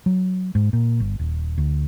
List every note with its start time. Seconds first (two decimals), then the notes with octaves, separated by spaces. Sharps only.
0.06 F#3
0.55 G#2
0.73 A#2
1.00 G1
1.19 D#1
1.58 D2